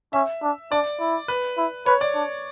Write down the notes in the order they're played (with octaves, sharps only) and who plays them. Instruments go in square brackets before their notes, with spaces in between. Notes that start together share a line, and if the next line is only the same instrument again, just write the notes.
[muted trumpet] C#4 [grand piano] E5
[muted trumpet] D4
[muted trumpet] D4 [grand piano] D5
[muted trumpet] E4
[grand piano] B4
[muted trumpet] E4
[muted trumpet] B4 [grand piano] C#5
[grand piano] D5
[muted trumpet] D4